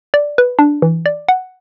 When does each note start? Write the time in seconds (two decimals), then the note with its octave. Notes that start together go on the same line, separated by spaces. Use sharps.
0.14 D5
0.38 B4
0.59 D4
0.82 E3
1.06 D5
1.28 F#5